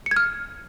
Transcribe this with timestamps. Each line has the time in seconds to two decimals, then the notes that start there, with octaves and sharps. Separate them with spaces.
0.06 C#7
0.11 G#6
0.16 F6